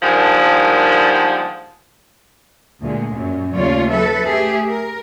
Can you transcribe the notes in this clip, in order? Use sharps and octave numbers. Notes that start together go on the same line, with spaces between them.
D3 D#3 F3 G3 G#3 A#3
D2 A#2 G#3
F#2 A#2
D#2 C#3 A3 F4 C#5 D5
F#3 A4 B4 E5
A3 G4 G#4 E5
A#4